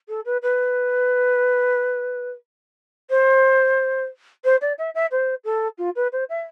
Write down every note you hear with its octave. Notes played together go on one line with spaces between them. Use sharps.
A4
B4
B4
C5
C5
D5
E5
E5
C5
A4
F4
B4
C5
E5